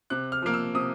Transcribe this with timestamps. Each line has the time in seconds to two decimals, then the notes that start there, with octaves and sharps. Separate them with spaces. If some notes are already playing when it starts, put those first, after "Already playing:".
0.10 C3 F#6
0.32 F6
0.42 F3 A#3 F6
0.54 E6
0.75 C3 D#6